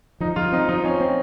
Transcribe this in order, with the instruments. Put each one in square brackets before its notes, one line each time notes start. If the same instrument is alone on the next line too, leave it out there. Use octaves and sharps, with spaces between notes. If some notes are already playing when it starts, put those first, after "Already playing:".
[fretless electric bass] F3 [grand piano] D#4
[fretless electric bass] F3 [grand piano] F4
[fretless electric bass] C4 [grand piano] D#4
[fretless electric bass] F3 [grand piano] D#4
[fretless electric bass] C4 [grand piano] C#4
[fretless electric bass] C4